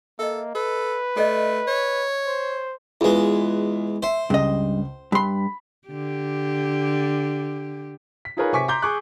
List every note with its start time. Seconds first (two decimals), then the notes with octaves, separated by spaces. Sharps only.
0.19 A#3 A4 D#5 E5
0.55 A4 B4
1.17 A3 A4 D5 D#5
1.68 C#5
2.27 C5
3.01 E2 G#3 F4 B4
4.03 C5 E5
4.30 C#2 G2 D#5
5.12 G2 B5 C6
5.88 D3 G4
8.25 B6
8.37 D#4 F4 G#4 A#4 B4 C#5
8.53 C3 G#5 C#6 D6 B6
8.68 A#5 C6 D6 G6 G7
8.82 G#4 C#6 D6 F#6